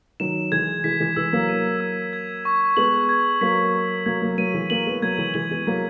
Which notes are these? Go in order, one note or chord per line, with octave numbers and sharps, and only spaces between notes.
D#3 F#3 E7
E3 G#3 G#6
E3 G#3 B6
E3 G#3
E3 G#3 E6
F#3 A#3
D#7
E6
G#6
C#6
G#3 B3 F#7
G#6
F#3 A#3 B6
C#6
F#3 A#3 G#6
F#3 A#3
F#3 A#3 D#7
E3 G#3
F#3 A#3 F#7
G#3 B3
F#3 A#3 G#6
E3 G#3
E3 G#3 F#7
G#3 B3
F#3 A#3 B6